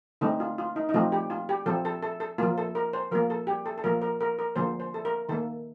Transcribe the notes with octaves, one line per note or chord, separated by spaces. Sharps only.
D3 A3 C4 D#4
F4
F4
D#4
D#4
F3 A3 C4 F4
G4
F4
G4
F3 C4 A4
A4
A4
A4
F3 A#3 F4
A4
A#4
C5
F3 A#3 A#4
A4
G4
A4
A4
F3 A#3 A#4
A#4
A#4
A#4
D3 F3 A#3 C5
C5
A4
A#4
D#3 A#3 A4